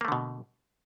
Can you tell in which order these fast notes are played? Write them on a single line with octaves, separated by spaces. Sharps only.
A#3 A3 D3 B2